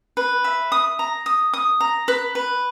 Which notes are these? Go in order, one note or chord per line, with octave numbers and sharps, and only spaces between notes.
B4
E5
D#6
A#5
D#6
D#6
A#5
B4
B4